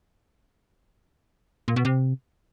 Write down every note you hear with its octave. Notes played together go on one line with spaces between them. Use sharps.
A#2
B2
C3